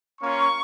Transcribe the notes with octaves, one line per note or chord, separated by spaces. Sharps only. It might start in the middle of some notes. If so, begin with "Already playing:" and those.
A#3 C#4 F4 C#6